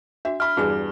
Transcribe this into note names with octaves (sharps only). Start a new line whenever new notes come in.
D4 F#4 E5
E5 B5 F6
E2 G2 F#4 G#4 G#5